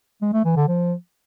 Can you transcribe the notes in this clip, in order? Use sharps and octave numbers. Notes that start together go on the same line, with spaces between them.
G#3
A3
E3
D3
F3